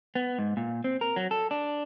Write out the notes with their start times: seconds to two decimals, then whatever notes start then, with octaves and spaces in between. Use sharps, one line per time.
0.15 B3
0.38 G#2
0.57 A#2
0.84 C4
1.01 A#4
1.16 F#3
1.31 A4
1.51 D4